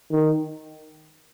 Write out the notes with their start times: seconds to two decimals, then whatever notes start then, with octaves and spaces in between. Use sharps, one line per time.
0.12 D#3